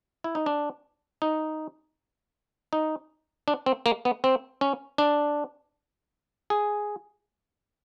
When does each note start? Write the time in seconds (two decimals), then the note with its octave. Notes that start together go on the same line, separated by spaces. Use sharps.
0.24 E4
0.35 D#4
0.46 D4
1.22 D#4
2.73 D#4
3.48 D4
3.66 C4
3.86 A#3
4.05 B3
4.24 C4
4.61 C#4
4.98 D4
6.50 G#4